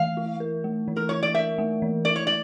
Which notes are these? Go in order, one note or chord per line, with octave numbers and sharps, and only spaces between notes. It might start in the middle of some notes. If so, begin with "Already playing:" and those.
Already playing: E3 A3 F5
E4
A#4
A3
E3
A#4
E4 C#5
D5
A#4 E5
A3
E3
E4 D5
C#5
D5